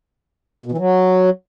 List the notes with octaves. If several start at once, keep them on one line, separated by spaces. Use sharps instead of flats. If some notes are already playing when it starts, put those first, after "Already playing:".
B2
E3
F#3